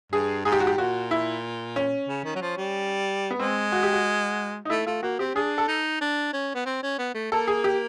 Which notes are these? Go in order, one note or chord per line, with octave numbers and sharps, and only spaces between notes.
G2 G#4
G#2 G#4
G4
F#4
G4
A#2 F#4
E4
C#4
C#3
D#3
F#3
F3
G3
B3
G#3 C4
F#4
G4
F#4
D#4
A3 E4
A3 F4
A#3 F#4
C4 G4
D4 G#4
A4
D#4
D4
C#4
B3
C4
C#4
B3
A3
A#3 A4
G#4
G4